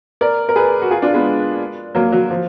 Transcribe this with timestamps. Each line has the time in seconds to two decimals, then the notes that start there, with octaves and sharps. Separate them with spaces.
0.21 A#4 D5
0.49 A#4
0.56 G#4 B4
0.82 F#4
0.91 F4 G#4
1.02 D4 F4
1.14 G#3 B3
1.95 F#3 A#3
2.12 F#3
2.31 F3